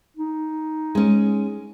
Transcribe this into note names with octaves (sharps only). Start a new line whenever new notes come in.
D#4
G#3 C#4